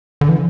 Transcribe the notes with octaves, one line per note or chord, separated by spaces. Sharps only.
D3
E3